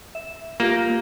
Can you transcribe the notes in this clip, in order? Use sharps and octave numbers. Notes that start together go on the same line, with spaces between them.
E5
A#3 F4 G4 A#4